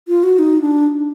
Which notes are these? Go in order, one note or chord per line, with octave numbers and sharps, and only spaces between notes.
F4
F#4
D#4
D4